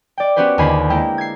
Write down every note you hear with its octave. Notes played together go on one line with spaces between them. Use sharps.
D5 G5
B3 C#4 F#4 G4 B4 C5
D#2 D3 F4 G#5 B5 C7
G#3 A#3 E4 G5
G#6 C7